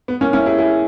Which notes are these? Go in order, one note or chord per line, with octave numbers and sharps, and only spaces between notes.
B3
A#3 C#4
C#4 E4
E4 G#4
E4 G#4